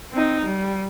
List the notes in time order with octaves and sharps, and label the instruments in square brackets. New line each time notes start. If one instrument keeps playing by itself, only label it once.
[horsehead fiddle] C4 D#4
G3